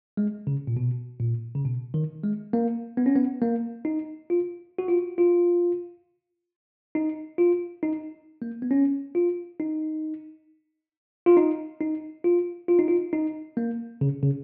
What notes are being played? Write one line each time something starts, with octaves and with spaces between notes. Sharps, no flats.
G#3
C#3
A#2
B2
A#2
C#3
B2
D#3
G#3
A#3
B3
C#4
B3
A#3
D#4
F4
F#4
F4
F4
D#4
F4
D#4
A#3
B3
C#4
F4
D#4
F4
D#4
D#4
F4
F4
D#4
F4
D#4
A#3
C#3
C#3